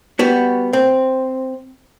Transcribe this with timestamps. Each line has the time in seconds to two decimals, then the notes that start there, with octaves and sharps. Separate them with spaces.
0.19 G3 B3 F#4
0.73 C4